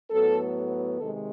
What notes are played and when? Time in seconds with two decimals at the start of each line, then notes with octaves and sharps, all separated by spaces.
0.10 A2 F#3 B3 A4
0.98 C3 D#3 G#3 A4